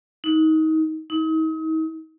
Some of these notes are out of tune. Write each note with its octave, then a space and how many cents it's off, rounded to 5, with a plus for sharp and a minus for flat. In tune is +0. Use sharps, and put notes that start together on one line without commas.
D#4 +25
D#4 +40